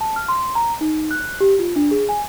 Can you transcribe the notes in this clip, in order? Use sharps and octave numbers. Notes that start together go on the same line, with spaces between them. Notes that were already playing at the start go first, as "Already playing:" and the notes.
A5
F6
C6
A#5
D#4
F#6
G4
F4
D4
G#4
G#5